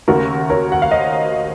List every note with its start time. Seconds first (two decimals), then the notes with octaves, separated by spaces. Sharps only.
0.08 D#2 C#3 A3 F#4 A#4
0.50 A#4 C#5
0.72 F#5
0.82 F5
0.91 C5 D#5